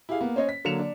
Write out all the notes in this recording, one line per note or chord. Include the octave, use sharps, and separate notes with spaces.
E4 G4 G#4 F5
A#3 B3
C#4 C5 C#5 D#5
B6
D3 F#3 A#3 C#7 E7 F7
D4